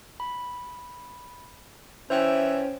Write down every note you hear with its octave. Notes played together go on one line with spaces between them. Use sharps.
B5
E3 C#4 C5 E5 G5